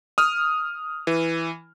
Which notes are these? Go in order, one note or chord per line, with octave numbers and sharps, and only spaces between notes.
D#6 F6
E3